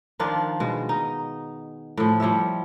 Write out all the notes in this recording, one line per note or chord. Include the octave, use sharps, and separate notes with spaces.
D#3 F3 D4 F4
B2 G#3
D#4
A2 F3
F3 G3 C#5 E5